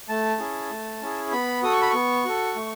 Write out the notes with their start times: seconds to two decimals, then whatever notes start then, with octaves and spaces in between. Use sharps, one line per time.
0.09 A3 A5
0.39 C#4 E4 G#4
0.71 A3
1.02 C#4 E4 G#4
1.32 B3 B5
1.63 F#4 A4 D#6
1.72 C#6
1.82 B5
1.90 B3 C#6
2.25 F#4 A4
2.56 A3